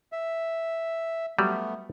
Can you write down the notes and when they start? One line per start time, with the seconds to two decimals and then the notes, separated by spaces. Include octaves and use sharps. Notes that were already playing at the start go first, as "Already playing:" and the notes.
0.12 E5
1.39 F#3 G3 A3 B3